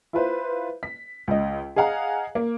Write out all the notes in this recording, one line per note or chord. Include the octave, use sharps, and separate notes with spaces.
E4 F4 B4 C5
B6
C#2 D#5
G#4 D#5 F5 F#5 A#5
A#3